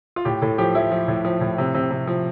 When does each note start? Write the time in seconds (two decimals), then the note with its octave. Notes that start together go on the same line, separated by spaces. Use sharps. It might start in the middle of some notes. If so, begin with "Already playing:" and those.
0.16 F4
0.25 A2 G4
0.42 A2 A4
0.58 F3 G4
0.75 F3 E4
0.92 F3
1.08 A2
1.25 F3
1.41 A2
1.58 C3
1.74 C3
1.91 C3
2.07 F3